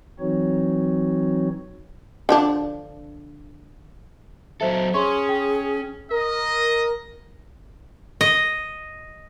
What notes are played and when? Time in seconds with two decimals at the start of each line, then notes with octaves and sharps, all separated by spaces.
0.20 E3 F#3 C4 D#4 F#4 C#5
2.29 D3 F3 D4
4.61 F#3 A4 C5 E5
4.94 C#4 G#4 C6 C#6
5.29 G5
6.11 A#4 D#5
8.21 D#5